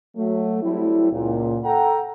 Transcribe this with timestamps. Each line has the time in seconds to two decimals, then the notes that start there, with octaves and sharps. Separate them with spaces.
0.16 F#3 A3
0.62 F#3 G3 A3 C4 E4
1.11 C#2 A#2
1.64 A4 F#5 G5 A#5